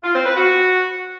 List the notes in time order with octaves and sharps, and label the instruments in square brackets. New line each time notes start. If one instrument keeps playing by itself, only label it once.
[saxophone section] F4
C4
B4
F#4